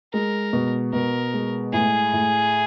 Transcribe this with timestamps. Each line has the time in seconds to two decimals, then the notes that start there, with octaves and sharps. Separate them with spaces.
0.13 G#3 A#4
0.53 B2
0.93 B2 A#4
1.34 G#3
1.73 A2 G#4
2.13 A2